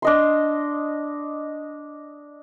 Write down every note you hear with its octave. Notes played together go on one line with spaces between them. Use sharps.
D4 D#5 C6